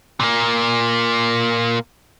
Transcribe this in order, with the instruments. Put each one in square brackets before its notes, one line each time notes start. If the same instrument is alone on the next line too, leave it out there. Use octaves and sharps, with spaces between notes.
[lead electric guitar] A#2 A#3